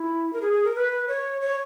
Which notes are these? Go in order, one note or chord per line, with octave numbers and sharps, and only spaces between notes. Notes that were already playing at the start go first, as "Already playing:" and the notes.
Already playing: E4
A#4
G#4
G#4
A#4
B4
C#5
C#5